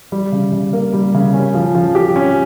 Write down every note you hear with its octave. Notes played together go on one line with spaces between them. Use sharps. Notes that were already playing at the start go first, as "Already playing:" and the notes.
G3
C#3
C#3
A#3
G3
C#3
C#4
F3
F3
G4
C#4